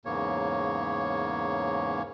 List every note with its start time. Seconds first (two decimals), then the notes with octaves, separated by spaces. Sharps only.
0.05 E2 G#2 C#3 A#3 C#5